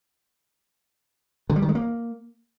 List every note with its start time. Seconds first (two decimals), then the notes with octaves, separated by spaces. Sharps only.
1.50 D3
1.56 G3
1.62 D#3
1.69 G#3
1.75 A#3